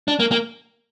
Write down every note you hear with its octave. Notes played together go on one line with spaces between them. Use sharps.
D4
A#3
A#3